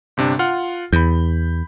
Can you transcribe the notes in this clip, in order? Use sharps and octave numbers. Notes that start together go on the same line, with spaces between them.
G1 C3 D4
F4 F#5 F6
E2 B5 G6